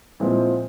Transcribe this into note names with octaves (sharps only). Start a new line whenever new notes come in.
A#2 F3 G#3 C4 E4